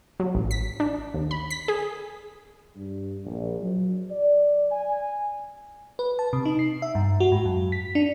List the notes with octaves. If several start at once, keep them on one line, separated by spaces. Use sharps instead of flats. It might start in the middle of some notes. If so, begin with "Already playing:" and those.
F#3
A1
B6
D4
D#2
B5
B6
G#4
G2
A#1
F#3
D5
G#5
B4
A5
C3
D#4
C7
E5
G2
F#4
G#2
F#2
B6
D4